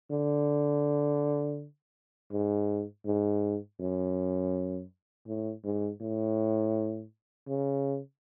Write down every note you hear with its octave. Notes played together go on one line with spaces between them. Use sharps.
D3
G#2
G#2
F#2
A2
G#2
A2
C#3